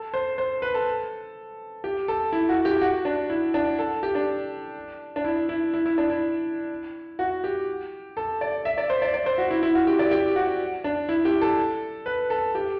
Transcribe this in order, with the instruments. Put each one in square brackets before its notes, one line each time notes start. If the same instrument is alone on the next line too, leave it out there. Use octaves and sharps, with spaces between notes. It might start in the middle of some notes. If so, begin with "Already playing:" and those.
Already playing: [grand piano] A4
C5
C5
B4
A4
G4
A4
E4
F#4
G4
F#4
D4
E4
D4
A4
G4
D4
D4
E4
E4
E4
E4
D4
E4
F#4
G4
A4
D5
E5
D5
C5
D5
D5
C5
F#4
E4
E4
F#4
G4
D5
G4
F#4
D4
E4
G4
A4
B4
A4
G4